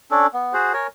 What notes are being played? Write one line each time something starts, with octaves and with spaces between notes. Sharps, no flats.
C#4 D4 A4
B3
F#4 G#4 C5
A#4 C#5 G#5